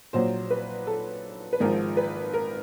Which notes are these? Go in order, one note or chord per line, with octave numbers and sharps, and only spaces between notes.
A#1 A#2 F#3 C5
B4
A4
B4
G#1 G#2 F3 A#4
B4
A#4